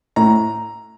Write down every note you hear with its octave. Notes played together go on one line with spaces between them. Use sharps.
A2 A#5